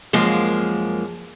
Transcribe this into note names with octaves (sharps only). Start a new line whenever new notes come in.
F#2 F3 G#3 A#3